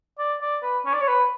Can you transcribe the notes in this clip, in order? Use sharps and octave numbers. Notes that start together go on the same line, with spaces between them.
D5
D5
B4
C#4
D5
C#5
B4